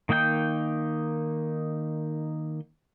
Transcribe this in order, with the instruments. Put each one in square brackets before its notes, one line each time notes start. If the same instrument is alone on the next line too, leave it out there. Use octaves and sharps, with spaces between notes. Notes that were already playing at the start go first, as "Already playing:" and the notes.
[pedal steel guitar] D#3 A#3 D#4 G5 G6